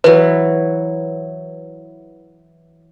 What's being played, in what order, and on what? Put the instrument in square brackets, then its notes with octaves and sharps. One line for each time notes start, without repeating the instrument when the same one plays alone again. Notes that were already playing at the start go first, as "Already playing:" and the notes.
[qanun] E3 F#3 [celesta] B4